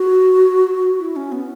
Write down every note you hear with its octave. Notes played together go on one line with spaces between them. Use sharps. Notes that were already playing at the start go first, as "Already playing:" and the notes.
Already playing: F#4
E4
C#4
B3